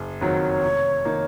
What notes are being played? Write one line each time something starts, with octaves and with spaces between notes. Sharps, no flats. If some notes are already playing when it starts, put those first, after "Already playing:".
Already playing: F#1
F2 D#3 F#3 C#5
F1
D#3 A#3 D#4